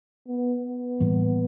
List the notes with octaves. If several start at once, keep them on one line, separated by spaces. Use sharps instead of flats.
B3
B3
A2 E3 G3 A#3